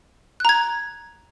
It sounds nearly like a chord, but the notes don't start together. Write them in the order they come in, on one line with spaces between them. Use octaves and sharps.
F#6 A#5 G#6